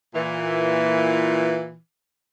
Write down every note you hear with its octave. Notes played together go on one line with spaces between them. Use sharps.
A#2 E3